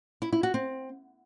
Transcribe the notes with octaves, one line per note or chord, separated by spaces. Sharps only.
E4
E4
F#4
C4